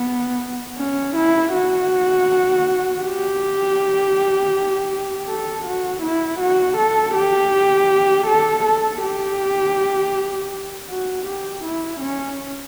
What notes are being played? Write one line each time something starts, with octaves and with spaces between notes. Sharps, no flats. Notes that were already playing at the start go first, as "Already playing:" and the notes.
Already playing: B3
C#4
E4
F#4
G4
A4
F#4
E4
F#4
A4
G4
A4
A4
G4
F#4
G4
E4
C#4